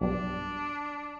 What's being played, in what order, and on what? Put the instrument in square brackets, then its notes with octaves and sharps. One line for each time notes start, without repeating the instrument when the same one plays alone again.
[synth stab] B1 G2 [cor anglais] D4